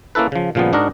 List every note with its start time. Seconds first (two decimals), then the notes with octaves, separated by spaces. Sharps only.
0.15 A#3 C#4 E4 A4 B4
0.32 C#3 F3
0.55 A#2 C#3 F3 G3 B3
0.73 G#2 D4 F#4 A#4 D#5